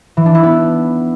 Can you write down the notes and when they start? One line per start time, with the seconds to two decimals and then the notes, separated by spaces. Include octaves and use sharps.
0.17 E3
0.26 D4
0.35 E4
0.43 B3